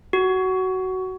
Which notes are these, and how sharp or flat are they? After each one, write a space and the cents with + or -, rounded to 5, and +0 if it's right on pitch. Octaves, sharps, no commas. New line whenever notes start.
F#4 +15